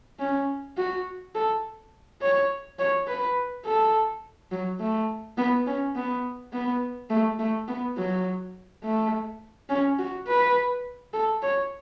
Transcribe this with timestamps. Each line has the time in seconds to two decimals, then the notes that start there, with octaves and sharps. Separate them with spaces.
0.19 C#4
0.77 F#4
1.35 A4
2.21 C#5
2.79 C#5
3.07 B4
3.65 A4
4.52 F#3
4.80 A3
5.38 B3
5.67 C#4
5.95 B3
6.53 B3
7.10 A3
7.39 A3
7.68 B3
7.97 F#3
8.83 A3
9.69 C#4
9.98 F#4
10.27 B4
11.13 A4
11.42 C#5